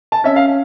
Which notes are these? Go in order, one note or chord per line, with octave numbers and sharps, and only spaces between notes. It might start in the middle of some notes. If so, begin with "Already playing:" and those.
A5
C#4 E5
F5